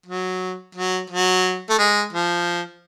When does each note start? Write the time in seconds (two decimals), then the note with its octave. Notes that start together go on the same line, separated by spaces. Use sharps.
0.06 F#3
0.75 F#3
1.10 F#3
1.70 A3
1.79 G#3
2.13 F3